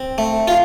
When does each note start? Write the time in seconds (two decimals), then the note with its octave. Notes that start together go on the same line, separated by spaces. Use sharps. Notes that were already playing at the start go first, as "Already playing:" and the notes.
Already playing: C4
0.18 A3
0.48 F4